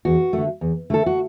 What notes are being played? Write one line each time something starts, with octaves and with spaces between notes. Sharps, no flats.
E2 F#4
D3 A3
E2
D3 A3 A4
F#4